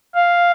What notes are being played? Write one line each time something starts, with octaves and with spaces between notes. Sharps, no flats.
F5